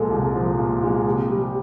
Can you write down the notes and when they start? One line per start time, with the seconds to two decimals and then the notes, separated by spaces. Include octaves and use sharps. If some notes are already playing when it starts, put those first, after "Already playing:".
Already playing: C2 A#2 F3 G#3 A4
0.10 C2
0.35 F3
0.58 A#2
0.82 G#3
1.05 C3
1.30 G3